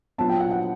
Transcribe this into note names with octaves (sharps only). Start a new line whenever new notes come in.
A#2 F#3 B3 A5
G5
F#5
F#5